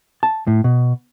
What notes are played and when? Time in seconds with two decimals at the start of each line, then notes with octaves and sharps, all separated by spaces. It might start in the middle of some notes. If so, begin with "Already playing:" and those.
0.23 A5
0.47 A2
0.64 B2